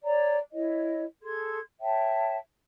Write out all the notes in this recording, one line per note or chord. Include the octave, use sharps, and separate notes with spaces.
C#5 D5 A#5
E4 C#5 D#5
G#4 A4 C6 G#6
C#5 E5 G5 A5